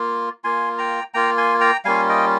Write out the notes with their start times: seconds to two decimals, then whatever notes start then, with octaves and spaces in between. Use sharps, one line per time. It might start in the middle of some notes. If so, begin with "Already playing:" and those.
Already playing: A#3 F4
0.44 A#3 F4 G#5 C6
0.78 G5 A#5
1.14 A#3 F4 G5 A#5
1.37 G#5 C6
1.61 G5 A#5
1.85 G3 A#3 C#4 F4 F5 G#5
2.09 D#5 G5